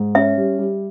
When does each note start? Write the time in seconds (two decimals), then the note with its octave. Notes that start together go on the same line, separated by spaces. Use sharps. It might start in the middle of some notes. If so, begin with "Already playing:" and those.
Already playing: G#2
0.15 C#4 E5
0.38 G3
0.59 G3